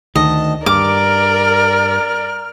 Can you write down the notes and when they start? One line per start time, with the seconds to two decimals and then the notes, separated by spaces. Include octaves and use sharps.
0.15 D2 D#3 D#5 A5
0.66 G2 A#4 D5 D6 F6